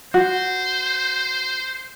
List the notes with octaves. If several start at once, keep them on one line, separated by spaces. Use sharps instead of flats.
F#4 C5